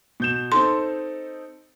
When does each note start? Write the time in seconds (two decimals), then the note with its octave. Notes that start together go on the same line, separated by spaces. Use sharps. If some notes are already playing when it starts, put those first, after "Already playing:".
0.20 B2 G6 E7
0.52 C4 D#4 A4 C6